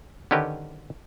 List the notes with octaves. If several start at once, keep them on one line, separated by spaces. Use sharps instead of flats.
D3 D#3 C#4 G4 A#4 B4